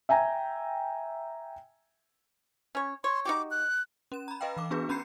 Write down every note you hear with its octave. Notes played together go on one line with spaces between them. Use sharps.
E5 G5 G#5 A#5
C#4 C#5
C#5 C6
D#4 F#4 G4 D6
F#6
C#4 E7
A#5 B5
B4 D#5 F5 G5
E3 F5 D6
B3 D4 F#4 G#4 B4
C#4 A#5 B5 G6 C7 C#7